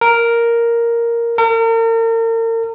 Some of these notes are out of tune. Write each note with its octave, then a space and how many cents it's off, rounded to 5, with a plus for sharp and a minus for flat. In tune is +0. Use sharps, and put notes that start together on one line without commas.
A#4 +0
A#4 -40